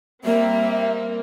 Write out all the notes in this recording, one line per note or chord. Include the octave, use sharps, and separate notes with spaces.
G3 A#3 C4 E5